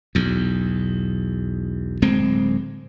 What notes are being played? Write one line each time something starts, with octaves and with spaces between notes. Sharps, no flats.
B1 E2
D1 G#3 C4